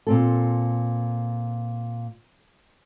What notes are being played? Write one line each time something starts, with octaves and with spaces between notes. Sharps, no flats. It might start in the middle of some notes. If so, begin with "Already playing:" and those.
A#2 C4 A4